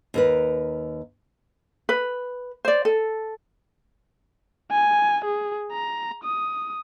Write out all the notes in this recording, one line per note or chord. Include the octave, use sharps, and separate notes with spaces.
D#2 A#4 B4
B4
C5 D5
A4
G#5
G#4
A#5
D#6